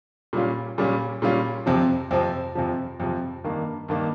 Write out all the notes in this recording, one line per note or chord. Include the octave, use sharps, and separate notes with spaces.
A#2 G3 C#4 F4
A#2 G3 C#4 F4
A#2 G3 C#4 F4
F2 C3 F3
F2 C3 F3
F2 C3 F3
F2 C3 F3
G2 D#3 A#3
G2 D#3 A#3